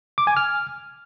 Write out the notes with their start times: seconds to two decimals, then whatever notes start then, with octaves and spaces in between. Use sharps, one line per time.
0.18 D6
0.27 G#5
0.37 F6